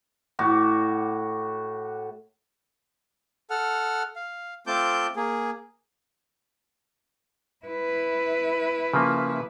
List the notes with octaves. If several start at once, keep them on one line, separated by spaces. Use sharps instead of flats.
A2 F#4 D6
A4 F#5 F6
F5
A3 C4 F4 A5 D6 G6
A#3 G#4
E4 B4
C#3 F3 A#3